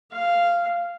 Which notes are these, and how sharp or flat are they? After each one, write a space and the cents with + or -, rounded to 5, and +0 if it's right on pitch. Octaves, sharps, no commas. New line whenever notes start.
F5 -10